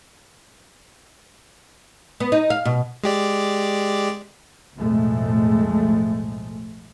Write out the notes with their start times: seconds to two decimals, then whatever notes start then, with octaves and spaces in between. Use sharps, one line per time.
2.20 B3
2.32 D#4
2.50 F5
2.65 B2
3.04 G#3 G4 D5
4.77 B1 F2 A2 G#3 A3